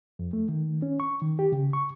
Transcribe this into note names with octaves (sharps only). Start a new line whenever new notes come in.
F2
A3
D#3
C#4
C#6
D#3
G4
C#3
C#6